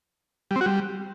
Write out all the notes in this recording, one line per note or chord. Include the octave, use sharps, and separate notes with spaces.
G3
C4
F#4
G3